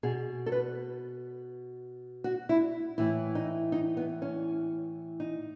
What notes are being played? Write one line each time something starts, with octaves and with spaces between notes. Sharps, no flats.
B2 G#4
A4
B4
F#4
E4
A2 E3 E4
D#4
D#4
B3
C#4
D#4